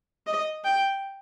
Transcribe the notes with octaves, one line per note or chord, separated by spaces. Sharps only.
D#5
G5